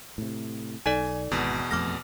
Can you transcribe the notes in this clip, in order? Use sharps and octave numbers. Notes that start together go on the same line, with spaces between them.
A2 C3
B1 D#4 A4 D5 G#5
G#1 E2 B2
A1 F2 A3 D6 F6 A#6